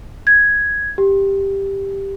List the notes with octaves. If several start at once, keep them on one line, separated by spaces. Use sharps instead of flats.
G#6
G4